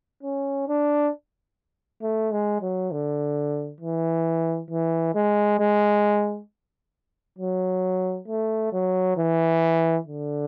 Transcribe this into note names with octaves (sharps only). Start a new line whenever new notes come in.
C#4
D4
A3
G#3
F#3
D3
E3
E3
G#3
G#3
F#3
A3
F#3
E3
D3